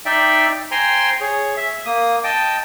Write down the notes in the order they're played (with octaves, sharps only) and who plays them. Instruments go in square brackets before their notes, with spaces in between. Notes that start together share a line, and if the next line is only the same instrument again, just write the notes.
[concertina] D#4 D5 E5 G5
C5 G5 G#5 A#5 C6
G#4 C#5
E5
A#3 D#6
D#5 G5 A5